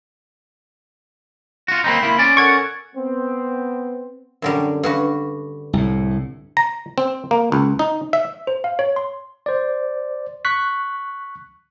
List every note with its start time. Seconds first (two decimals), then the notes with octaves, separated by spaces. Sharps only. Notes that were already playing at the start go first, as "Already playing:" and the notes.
1.68 F4 F#4
1.84 A#3 C4 D#4 B5 C6
2.03 A#3 E4
2.19 C#4 D5
2.37 A4 A#4 F#5 C#6 G#6
2.96 B3 C4
4.42 F#2 D3 G3
4.83 G2 F#4 B4
5.73 C2 A2
6.57 A#5
6.98 C4
7.31 A#3
7.52 C#2
7.79 D#4
8.13 E5
8.47 C5
8.64 F5
8.79 C#5
8.96 C6
9.46 C5 D5
10.45 C#6 F#6 B6